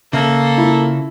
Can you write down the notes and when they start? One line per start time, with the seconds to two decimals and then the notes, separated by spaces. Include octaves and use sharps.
0.13 C#3 A#3 A4 E5
0.58 E4 F4